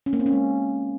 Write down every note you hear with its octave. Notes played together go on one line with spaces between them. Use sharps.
C#4
A#3
C4
C#4
G#3